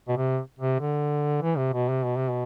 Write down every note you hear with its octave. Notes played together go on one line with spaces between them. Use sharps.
B2
C3
C3
D3
E3
C3
B2
C3
B2
C3
B2